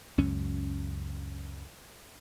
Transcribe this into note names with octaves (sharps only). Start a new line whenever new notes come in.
C#2 F#2 C#4